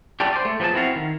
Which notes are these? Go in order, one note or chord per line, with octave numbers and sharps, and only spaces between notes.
F#3 G3 A3 C#4 D4 G4
C5 D5
A3
F3 F#3 B3 G#4 A5
C4 E4 F#4 F5
D#3